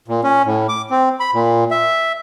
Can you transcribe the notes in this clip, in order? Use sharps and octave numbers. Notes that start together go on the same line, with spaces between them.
A#2
C#4
A2
D6
C4
B5
A#2
E5